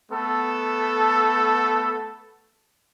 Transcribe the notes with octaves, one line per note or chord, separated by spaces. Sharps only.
A3 B3 A4